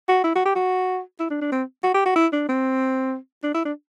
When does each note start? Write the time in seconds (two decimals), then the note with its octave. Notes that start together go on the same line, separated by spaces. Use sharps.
0.08 F#4
0.24 E4
0.35 F#4
0.45 G4
0.55 F#4
1.20 E4
1.30 D4
1.41 D4
1.52 C4
1.83 F#4
1.94 G4
2.06 F#4
2.16 E4
2.33 D4
2.49 C4
3.43 D4
3.54 E4
3.65 D4